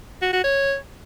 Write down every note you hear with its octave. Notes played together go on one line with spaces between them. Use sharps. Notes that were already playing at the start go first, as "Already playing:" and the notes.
F#4
F#4
C#5